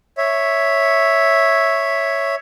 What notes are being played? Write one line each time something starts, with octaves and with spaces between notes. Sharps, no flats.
C#5 E5